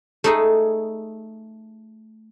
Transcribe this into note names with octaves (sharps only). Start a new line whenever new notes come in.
A3 D#4 G#4